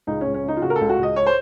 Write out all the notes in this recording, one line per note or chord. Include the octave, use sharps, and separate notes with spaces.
C#2 D#4
C#4
C#2
C#4
C#3 D#4
F4
C#3 F#4
A#4
A4
C#2
F#4
C#2 D#5
C#5
C5